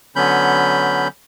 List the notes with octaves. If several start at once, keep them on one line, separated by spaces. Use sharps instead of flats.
D3 F#3 B3 C#4 B5 G6